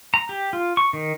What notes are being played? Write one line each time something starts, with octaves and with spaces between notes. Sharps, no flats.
A#5
G4
F4
C#6
D#3